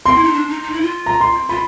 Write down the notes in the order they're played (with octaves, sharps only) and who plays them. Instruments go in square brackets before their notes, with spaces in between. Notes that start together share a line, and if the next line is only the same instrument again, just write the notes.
[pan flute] C4 [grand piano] C6
[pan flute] E4
D#4
D4
D#4
D#4
E4
F4
[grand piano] A#5
C6
[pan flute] F4 [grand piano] B5